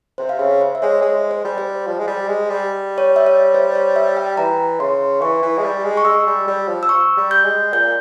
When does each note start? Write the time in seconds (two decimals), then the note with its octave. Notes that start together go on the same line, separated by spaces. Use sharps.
0.18 C3 C5
0.29 F5
0.39 C#3 E5
0.61 C5
0.75 E5
0.82 G#3 C#5
1.02 G#3 C5
1.31 C5
1.45 G3
1.58 C5
1.87 F3
1.99 G#3
2.07 G3
2.28 G#3
2.50 G3
2.98 C#5
3.16 E5
3.26 C#5
3.54 C5
3.75 C#5
3.96 E5
4.17 G5
4.37 E3 A#5
4.80 C#3 C6
5.21 E3 C#6
5.42 E3
5.57 G#3
5.64 G3
5.84 G#3
5.97 C#6
6.05 G#3 E6
6.26 G3
6.48 G3
6.68 F3
6.83 E6
6.89 C#6
7.17 G3
7.31 G6
7.45 G#3
7.73 A#2 G6